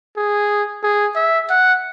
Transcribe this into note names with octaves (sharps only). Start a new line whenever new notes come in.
G#4
G#4
E5
F#5